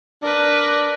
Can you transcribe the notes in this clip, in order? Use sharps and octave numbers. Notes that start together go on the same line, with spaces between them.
D4 A#4 B4